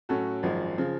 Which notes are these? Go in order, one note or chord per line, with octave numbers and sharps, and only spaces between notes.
A2 F#3 C#4 F#4 A4
G#1 F#2 F3 G#3
C#3 F3